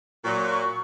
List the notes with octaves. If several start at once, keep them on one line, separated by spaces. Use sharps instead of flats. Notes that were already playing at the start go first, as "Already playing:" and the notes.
A#2 F#3 C#6